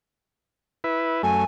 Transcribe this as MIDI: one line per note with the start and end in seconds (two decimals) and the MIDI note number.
0.84 1.22 64
0.84 1.22 71
1.23 1.45 42
1.23 1.45 57
1.23 1.44 80